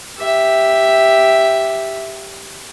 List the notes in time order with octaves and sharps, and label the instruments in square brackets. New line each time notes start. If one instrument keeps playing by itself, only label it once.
[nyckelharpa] G4 E5